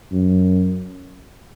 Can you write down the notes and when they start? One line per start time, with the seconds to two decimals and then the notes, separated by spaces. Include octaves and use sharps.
0.12 F#2